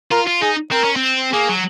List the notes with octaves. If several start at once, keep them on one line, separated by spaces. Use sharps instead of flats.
F4 A#4
F4
D#4 G#4
C4 A#4
C#4
C4
A#3 G#4
F#3